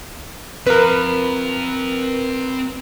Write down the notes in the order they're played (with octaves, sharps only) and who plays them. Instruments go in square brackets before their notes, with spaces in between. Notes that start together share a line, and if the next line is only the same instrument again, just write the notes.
[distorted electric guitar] C4 F5 [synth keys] A#4 B4